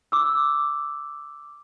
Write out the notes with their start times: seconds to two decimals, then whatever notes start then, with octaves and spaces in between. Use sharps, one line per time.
0.12 D6 E6